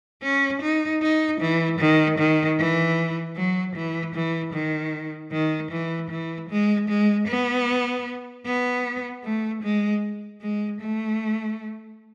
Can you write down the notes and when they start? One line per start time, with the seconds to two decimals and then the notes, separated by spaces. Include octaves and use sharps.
0.23 C#4
0.62 D#4
1.02 D#4
1.41 E3
1.79 D#3
2.18 D#3
2.58 E3
3.36 F#3
3.75 E3
4.15 E3
4.54 D#3
5.32 D#3
5.71 E3
6.11 E3
6.50 G#3
6.89 G#3
7.27 B3
8.45 B3
9.24 A3
9.63 G#3
10.41 G#3
10.81 A3